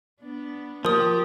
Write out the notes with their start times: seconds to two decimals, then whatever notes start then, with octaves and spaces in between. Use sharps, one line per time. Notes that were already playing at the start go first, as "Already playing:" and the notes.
0.20 B3 D4
0.85 F3 A#3 G4 A#4 D#6